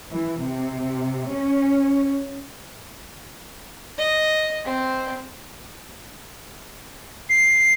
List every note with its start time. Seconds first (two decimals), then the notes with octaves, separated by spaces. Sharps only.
0.11 E3
0.42 C3
1.32 C#4
3.98 D#5
4.65 C4
7.29 C7